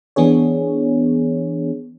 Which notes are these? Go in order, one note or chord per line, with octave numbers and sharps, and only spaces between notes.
E3 B3 D4 G#4 C#5